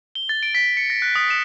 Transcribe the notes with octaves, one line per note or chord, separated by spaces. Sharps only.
G7
A6
D7
B6
C#7
A#6
F#6
D#6
E7